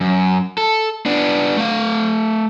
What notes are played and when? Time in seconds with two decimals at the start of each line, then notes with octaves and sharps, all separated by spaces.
0.01 F#2
0.58 A4
1.06 B3 D4
1.57 A3 F5